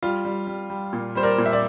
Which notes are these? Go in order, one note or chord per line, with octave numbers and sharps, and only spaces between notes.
G3 F4
G3
G3
G3
A#2
G3 C5
A#4 D5
A#2
E5
D5